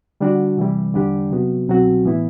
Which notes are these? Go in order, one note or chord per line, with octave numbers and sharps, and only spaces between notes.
D3 G3 D4 F#4
C3 E3 G3
E2 D3 G3 D4 G4
C3 F#3 B3 F#4
C2 B2 F#3 C4 F#4
A2 E3 B3 E4